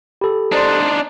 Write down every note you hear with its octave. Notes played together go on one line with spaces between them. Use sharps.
G4 A4 B5
D4 D#4 C5 D5 C6